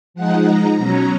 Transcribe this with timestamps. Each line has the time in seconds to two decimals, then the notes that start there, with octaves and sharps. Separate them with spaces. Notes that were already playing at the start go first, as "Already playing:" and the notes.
0.14 F3 G#3 D#4 F#5
0.45 A#5
0.77 B2 F#3 C#4 A#5